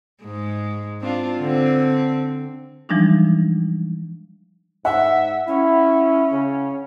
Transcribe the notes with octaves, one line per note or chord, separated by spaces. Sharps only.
G#2 G#3
C4 D4 F4
D3 C4
E3 F3 G3 G#3 D4 D#4
G#2 E5 F#5
C#4 E4
C#3